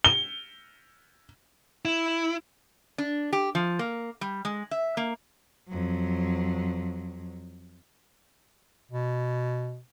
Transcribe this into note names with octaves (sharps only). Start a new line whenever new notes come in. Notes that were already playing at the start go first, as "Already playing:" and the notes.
G7
E4
D4
G4
F3
A#3
G3
G#3
E5
A#3
F2 F#3
B2